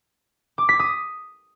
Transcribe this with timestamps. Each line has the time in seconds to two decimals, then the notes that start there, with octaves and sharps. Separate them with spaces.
0.58 D6
0.69 B6
0.79 D#6